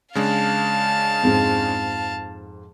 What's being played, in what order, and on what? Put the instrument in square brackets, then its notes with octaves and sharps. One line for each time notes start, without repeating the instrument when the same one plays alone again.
[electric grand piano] C#3 G#3 D4 [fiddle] F5 A5
[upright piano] F2 G#2